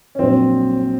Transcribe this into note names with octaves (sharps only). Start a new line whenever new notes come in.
C#4
A#1 A#2 F#3 C4